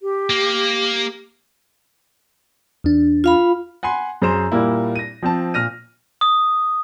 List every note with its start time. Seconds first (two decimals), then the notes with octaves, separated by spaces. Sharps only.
0.01 G4
0.30 A#3
2.84 E2 D4
3.24 F4 F5 B5
3.83 F#5 G#5 B5 C6
4.22 F#2 G#4 C5 A#5 C6 E7
4.52 A#2 G3 A#3 E4
4.96 A#6 D#7
5.22 F3 C4 A5
5.54 A#2 F6 A#6 D#7
6.21 D#6